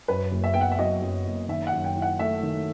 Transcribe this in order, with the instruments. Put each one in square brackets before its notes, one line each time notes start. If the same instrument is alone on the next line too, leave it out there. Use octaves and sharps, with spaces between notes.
[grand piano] F#2 [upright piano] B4
[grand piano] F#1
[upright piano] E5
[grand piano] B3 [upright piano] G5
[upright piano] F#5
E5
[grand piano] F#3 [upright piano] D#5
[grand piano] F#2
F#1
[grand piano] D#3 [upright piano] E5
[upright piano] F#5
[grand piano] F#2
[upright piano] G5
[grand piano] E4
[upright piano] F#5
[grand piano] A3 [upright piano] E5
[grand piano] D#3